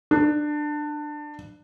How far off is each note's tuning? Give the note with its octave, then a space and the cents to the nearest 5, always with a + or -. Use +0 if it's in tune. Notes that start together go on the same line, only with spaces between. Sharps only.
D4 +20